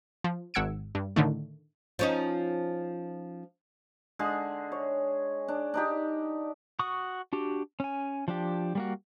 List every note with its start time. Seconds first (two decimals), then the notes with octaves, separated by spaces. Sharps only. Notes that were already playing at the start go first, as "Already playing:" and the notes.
0.24 F3
0.54 G#1 F#5 E6 G#6 C#7 D7
0.95 G2
1.16 A2 D3 D#3 A3
1.99 F3 C#4 D#4
4.19 D3 G#3 G#4
4.72 C#5
5.48 D4
5.74 D4 D#4 G4
6.79 F#4 C#6 D#6
7.33 D4 F#4 G4
7.80 C#4 G#5
8.28 F3 D4 G4
8.75 G3 A#3 F#4